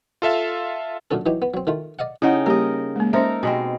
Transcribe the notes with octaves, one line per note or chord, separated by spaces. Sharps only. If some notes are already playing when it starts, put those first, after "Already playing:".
F4 A4 E5 F5
F#2 A#2 D3 C#4 A4
E3 F#3 D#4 G4
B3
F#3 C4
D#3 A3 F4
D5 D#5 F5 F#5
C#3 D#4 E4 D#5 F#5 G5
G3 A#3 G4 A#4 D#5
G#3 A#3
C#4 D#4 A4 A#4 C5 E5
B2 G#3 C4